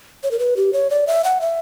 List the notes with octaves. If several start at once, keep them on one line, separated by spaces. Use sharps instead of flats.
C#5
A#4
B4
G4
C#5
D5
E5
F#5
E5